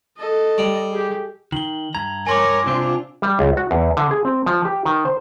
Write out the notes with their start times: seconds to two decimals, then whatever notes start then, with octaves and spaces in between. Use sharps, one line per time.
0.18 A4 D#5
0.58 G3
0.91 G4 G#4
1.52 D#3 F#7 G7
1.95 G2 A#5 G#6
2.27 A#4 C#5 G#5 C6 D6
2.67 C3 C4 D4 F4
3.22 G3
3.39 C#2
3.57 F#4
3.71 E2
3.97 D3
4.11 G#4
4.25 C4
4.46 F3
4.65 G4
4.85 D#3
5.05 C5